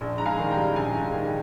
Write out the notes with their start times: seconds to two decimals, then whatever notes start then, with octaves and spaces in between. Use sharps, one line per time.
0.01 A#1
0.18 G#2 A#5
0.26 F5 G#5
0.39 D#3
0.51 G5 A#5
0.57 G3
0.76 A#1 F5 G#5
0.94 G#2
1.14 D#3